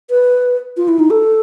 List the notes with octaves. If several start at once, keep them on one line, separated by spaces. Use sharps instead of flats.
B4
F4
E4
D#4
A4